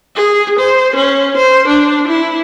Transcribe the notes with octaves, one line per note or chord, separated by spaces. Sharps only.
G#4
C5
C#4
C5
D4
E4